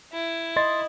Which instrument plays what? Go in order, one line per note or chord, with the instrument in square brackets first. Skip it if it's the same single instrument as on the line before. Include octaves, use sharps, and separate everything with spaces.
[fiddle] E4
[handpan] D#5 [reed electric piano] C6 A6